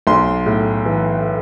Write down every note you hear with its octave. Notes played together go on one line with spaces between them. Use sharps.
B1 C6
A2
E3